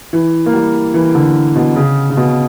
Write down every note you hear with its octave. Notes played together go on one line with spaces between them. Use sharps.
E3
A#3
G3
E3
D3
B2
C#3
C#3
B2